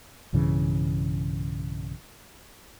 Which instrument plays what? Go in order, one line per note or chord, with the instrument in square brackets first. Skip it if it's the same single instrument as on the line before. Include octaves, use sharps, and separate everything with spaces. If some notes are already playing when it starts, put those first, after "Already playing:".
[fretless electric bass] B1 G2 C#3 E3